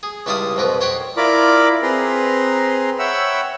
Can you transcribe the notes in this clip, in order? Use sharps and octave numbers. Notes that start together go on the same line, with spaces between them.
G#4
C#2 G3 E4 F5 A5 D#6
C2 F2 B2 A#4 B4
C5 C#5 F#5 G5 B5
E4 F4 A#4 D5 B5 D6
C4 G#4 B4 A#5 C6
C#5 E5 F#5 G5 B5 E6